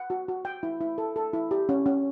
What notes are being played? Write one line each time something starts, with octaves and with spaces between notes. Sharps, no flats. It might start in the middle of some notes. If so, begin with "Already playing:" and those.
Already playing: F#5
F#4
F#4
G5
E4
E4
A4
A4
E4
G4
C#4
C#4